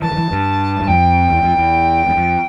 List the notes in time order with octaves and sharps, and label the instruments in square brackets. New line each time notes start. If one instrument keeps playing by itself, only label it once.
[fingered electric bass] E3 [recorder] A5
[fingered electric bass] D3
E3
G2
G2
[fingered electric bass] F2 [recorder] G5
[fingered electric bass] E2
F2
E2
E2
F2